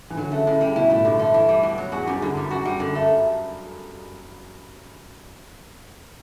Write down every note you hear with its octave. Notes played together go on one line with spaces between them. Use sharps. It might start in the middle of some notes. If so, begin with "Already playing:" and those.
E3
D3 F#3
C#3 A3
A2 C#3
C#3 G3
B2 E4
A2 A3
G2 D3
A3
E3
G3
B2
F#3
E2 F#4
F#2 G3
G2 D3
G3
F#2 F#4
G2 G3
F#2 D3
A3